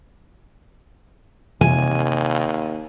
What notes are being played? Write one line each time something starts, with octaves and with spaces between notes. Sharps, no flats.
D#2 C3 G#5